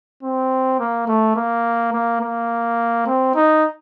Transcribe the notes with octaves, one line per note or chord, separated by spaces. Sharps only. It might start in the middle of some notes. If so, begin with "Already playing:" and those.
C4
A#3
A3
A#3
A#3
A#3
C4
D#4